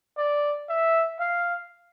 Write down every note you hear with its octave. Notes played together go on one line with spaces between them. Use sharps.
D5
E5
F5